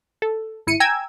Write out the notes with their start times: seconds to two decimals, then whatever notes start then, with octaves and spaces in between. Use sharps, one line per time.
0.22 A4
0.67 G#1 E4 C#7 D#7
0.80 G5 G#5 A#5 E6 G#6